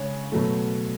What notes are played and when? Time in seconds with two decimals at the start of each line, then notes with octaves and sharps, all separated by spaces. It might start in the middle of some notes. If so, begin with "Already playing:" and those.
Already playing: C#3 G#3 C#5
0.32 B2 F#3 A3